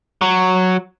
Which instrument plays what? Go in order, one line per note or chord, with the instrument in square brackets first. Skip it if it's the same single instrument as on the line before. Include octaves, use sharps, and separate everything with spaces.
[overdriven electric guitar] F#3